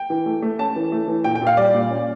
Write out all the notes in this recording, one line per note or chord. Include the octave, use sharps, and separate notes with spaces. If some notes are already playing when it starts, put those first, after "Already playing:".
Already playing: G5
E3
A3
A3
C#4 A5
E3
A3
E3
A#2 G5
G5
A#2
F5
G3 D5
A#2
C#4